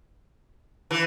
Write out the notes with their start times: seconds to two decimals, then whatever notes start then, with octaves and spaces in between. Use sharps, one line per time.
0.91 E3